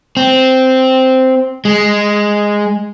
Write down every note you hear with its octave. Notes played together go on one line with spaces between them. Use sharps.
C4
G#3